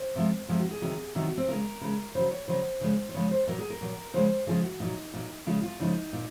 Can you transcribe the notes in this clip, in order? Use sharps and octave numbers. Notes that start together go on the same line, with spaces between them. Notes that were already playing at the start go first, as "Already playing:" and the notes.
Already playing: C5
C3 F3 G#3
C3 F3 G#3 G#4
F#4
G#4
C3 D#3 F#3
C3 D#3 F#3 F#4
F#4
C4
C#3 G#3 A#4
C#3 G#3
C#3 F#3 C5
C#5
C#3 F#3 C5
C#3 F3 G#3
C5
C#3 F3 G#3 C#5
C5
A#2 F#3 A#4
G#4
A#4
A#2 F#3
C#3 F3 G#3 C5
C#3 F3 G#3 G#4
F#4
A#2 F#3 D#4
A#2 F#3
C#3 F3 G#3 F4
F4
C#3 F3 G#3 D#4
A#2